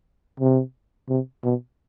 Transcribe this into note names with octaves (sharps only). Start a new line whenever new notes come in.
C3
C3
B2